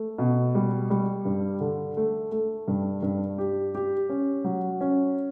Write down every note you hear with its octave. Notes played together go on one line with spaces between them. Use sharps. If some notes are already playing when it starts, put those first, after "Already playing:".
Already playing: A3
B2
G3
G3
G2
D3
A3
A3
G2
G2
G4
G4
C#4
F#3
C#4